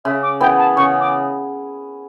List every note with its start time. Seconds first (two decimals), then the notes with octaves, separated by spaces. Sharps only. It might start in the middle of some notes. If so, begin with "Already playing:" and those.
0.05 C#3 E5
0.23 D6
0.40 E3 B3 G5
0.58 A5
0.76 C#3 C#6
1.00 D6